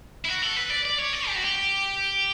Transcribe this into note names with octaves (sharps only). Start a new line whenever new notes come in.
E4
F#4
A4
B4
D5
D5
C#5
D5
G4
F#4
G4